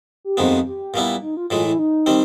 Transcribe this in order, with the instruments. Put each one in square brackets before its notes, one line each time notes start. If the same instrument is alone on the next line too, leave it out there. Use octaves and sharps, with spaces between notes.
[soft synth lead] G4
[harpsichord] F2 C3 D#3 G#3 B3
[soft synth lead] G4
[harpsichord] A#2 G3 B3 E4
[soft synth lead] D#4
F4
[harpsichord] A2 E3 G#3 [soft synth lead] F4
[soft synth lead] E4
D#4
[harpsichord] D#3 G3 C4